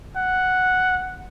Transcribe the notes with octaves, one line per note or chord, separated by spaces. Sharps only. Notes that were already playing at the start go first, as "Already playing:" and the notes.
F#5